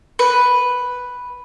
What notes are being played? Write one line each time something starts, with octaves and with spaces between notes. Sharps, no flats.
B4